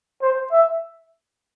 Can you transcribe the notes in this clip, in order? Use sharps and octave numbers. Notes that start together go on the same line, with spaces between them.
C5
E5